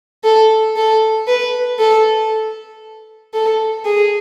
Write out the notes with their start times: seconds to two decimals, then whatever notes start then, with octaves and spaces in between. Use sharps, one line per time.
0.24 A4
0.76 A4
1.27 B4
1.79 A4
3.34 A4
3.85 G#4